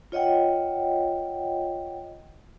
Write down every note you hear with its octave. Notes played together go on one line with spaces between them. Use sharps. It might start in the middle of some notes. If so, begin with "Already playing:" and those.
F4 C#5 D#5 F#5 G5